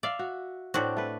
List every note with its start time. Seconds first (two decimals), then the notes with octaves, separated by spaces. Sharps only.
0.03 D5 E5 F5
0.19 F#4
0.74 A2 C4 D4 F#4
0.97 A3 B4